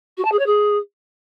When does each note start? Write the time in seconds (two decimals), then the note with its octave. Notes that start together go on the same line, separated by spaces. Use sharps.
0.17 F#4
0.25 A5
0.32 G#4
0.39 C#5
0.46 G#4